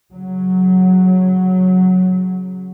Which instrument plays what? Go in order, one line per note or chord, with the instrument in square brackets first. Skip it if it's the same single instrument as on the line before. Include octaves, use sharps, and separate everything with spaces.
[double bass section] C#3 F#3